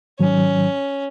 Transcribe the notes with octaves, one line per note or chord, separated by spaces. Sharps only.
G#2 D#3 F#3 C#4